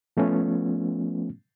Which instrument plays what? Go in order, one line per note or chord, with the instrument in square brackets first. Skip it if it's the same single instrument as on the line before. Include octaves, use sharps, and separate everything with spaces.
[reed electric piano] F3 A3 B3 C#4 F4